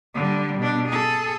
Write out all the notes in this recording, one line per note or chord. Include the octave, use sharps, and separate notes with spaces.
D3 G3
B2 D4
G#4 A4